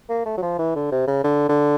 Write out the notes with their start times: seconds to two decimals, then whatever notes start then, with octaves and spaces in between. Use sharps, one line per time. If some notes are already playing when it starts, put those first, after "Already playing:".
0.09 A#3
0.25 A3
0.38 F#3
0.42 F3
0.59 E3
0.75 D3
0.92 C3
1.08 C#3
1.24 D3
1.49 D3